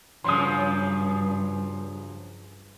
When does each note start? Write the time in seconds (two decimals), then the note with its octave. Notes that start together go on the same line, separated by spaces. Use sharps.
0.24 G2 C#3 F3 F#3 C6 D#6